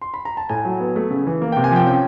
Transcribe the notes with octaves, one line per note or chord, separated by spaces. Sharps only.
C6
B5
A#5
A5
A2 G#5
F#3
B3
A3
C#3
E3
A#3
C3 G5
G#5
F3 G5
C#4 G5